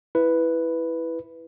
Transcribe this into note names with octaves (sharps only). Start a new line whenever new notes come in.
E4 B4